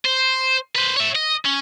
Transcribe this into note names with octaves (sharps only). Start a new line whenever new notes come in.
C5
B4 C5
C#5 E5
D#5
C#4